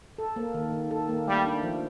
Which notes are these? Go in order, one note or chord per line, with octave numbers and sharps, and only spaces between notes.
A4
A#3
D#3
D#3
A4
A#3
G3 A3
D4
F3